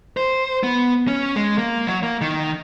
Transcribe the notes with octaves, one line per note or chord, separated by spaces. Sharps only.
C5
B3
C#4
G#3
A#3
F#3
A#3
D#3